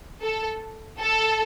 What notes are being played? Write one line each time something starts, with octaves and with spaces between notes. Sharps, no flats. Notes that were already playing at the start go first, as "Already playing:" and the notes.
A4
A4